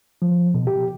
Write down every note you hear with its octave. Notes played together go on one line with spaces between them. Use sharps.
F3
B2
G4